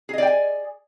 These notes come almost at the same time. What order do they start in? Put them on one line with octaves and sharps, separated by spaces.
G#4 D#5 D5 G5 G#5